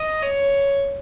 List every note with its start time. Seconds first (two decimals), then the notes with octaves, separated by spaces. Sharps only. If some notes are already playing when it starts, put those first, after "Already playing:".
Already playing: D#5
0.22 C#5